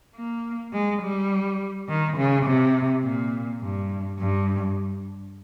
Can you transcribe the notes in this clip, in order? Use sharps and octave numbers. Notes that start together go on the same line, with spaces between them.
A#3
G#3
G3
D#3
C#3
C3
A#2
G2
G2